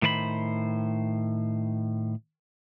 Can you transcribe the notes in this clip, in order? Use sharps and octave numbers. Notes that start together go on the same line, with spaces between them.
A2 D#3 C5 D5 B5